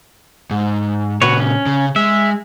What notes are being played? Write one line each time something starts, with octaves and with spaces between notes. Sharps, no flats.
G#2
A#2 C#3 F#4 B4 C#5
C#4
C#3
G#3 E5